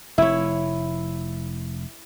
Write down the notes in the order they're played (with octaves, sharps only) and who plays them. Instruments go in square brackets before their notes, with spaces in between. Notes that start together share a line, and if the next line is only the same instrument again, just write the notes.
[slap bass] F1 [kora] E4 C#5